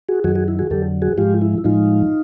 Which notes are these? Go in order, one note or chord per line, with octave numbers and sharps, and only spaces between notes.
F#4 G#4
F#2 D#3 F#3 F#4 G#4
F#4 G#4
E4
F#4 G#4
F2 D3 F#3 G4 A4
F#4 G#4
G#2 F3 G#3 F4 G4
E4
A2 F3 G#3 D#4 F4